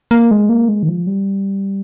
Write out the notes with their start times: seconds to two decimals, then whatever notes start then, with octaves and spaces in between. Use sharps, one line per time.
0.11 A#3
0.31 G#3
0.49 A#3
0.69 G#3
0.83 D#3
0.88 F3
1.07 G3